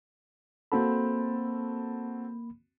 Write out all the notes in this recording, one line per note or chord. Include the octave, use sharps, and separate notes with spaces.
A#3 C4 F#4 A4 B5